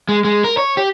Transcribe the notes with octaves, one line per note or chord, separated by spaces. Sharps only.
G#3
G#3
A#4
C#5
G4